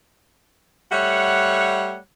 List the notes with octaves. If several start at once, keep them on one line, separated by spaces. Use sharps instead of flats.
G3 A3 C#5 F#5